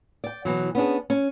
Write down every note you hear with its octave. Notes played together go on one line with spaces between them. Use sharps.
D5 G5
B2 E3 F#3
B3 C#4 D4 G#4
C#4